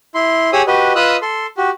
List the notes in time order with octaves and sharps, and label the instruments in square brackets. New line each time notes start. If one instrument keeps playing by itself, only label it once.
[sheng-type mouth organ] E4 C6
G4 G#4 C#5 D#6 E6
F#4 G4 B4 D#5
F4 B4 D#5 D#6 E6 F#6
A4 C6
F#4 G4